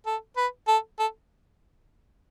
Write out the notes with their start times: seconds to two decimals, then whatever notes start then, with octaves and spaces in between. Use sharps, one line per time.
0.06 A4
0.37 B4
0.68 A4
0.99 A4